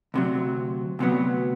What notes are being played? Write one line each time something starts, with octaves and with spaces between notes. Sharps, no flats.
D2 C3 F#3
D2 C3 F#3 B3